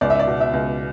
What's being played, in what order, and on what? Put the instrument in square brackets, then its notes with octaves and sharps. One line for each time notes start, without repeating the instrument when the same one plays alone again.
[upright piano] C#2 D5
E5
D5
B2
E5
C#2